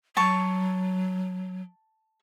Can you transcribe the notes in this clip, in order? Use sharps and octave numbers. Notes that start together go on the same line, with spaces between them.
F#3 A5 C#6